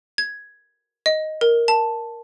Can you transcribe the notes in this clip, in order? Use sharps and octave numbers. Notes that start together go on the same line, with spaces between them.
G#6
D#5
A#4
A5